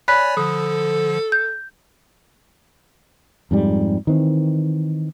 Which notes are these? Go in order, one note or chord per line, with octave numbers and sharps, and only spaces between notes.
C#5 D5 G#5 B5 F#6 B6
D3 F3 A4 D#6
G6
F2 G#2 G3
D#3 E3 C4